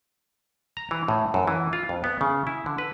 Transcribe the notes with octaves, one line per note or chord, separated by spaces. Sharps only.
A#5
E3
A2
F#2
E3
F4
F2
B3
C#3
E4
D3
B4